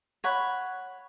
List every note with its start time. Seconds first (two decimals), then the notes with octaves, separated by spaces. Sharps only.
0.24 C#5 F#5 B5